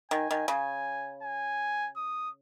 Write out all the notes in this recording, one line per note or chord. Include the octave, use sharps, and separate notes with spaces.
D#3 G#5
D#3
C#3 G#5
G#5
D#6